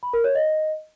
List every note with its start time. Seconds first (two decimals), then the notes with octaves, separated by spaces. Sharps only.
0.03 B5
0.13 A#4
0.24 C#5
0.35 D#5